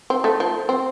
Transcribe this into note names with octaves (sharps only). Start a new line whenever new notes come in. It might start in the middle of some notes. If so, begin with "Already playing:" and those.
C4
A3
F3
C4